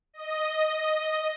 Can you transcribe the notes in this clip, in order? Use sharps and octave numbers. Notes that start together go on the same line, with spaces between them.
D#5